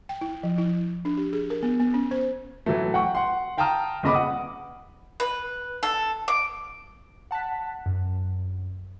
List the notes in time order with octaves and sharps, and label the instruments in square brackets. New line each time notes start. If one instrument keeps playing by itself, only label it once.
[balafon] G5
E4
F3
E4
D4
G4
G#4
A#4
B3
B3
C#4
C5
[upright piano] A2 E3 F#3 A3
F#5 G5 C#6
F#5 C6
F5 G5 A5 A#5 D#6 F6
G1 A#2 C#3 D#5 B5 D6
F#5 D#6
[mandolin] B4
A4
D6
[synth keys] F#5 A5 F#6 B6
F#2